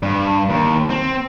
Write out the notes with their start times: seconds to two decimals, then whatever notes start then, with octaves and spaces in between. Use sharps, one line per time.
0.03 G2
0.49 D#2
0.90 C4